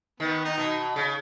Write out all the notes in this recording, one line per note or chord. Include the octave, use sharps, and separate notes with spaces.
D#3 B3
D#4
B2
C#3